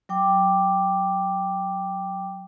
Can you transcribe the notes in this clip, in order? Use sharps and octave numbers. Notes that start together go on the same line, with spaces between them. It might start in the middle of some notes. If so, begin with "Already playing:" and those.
F#3 G5 D6